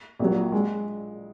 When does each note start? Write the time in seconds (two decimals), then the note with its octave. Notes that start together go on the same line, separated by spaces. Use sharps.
0.19 A#1 A#2 F#3
0.52 G#3